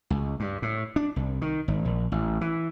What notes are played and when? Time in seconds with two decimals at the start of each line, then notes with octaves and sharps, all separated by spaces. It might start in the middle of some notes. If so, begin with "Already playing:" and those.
0.10 C#2
0.40 G2
0.62 A2
0.96 D4
1.16 C2
1.42 D#3
1.68 G#1
1.85 A#1
2.12 A1
2.41 E3